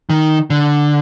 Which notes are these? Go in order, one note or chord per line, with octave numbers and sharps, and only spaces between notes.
D#3
D3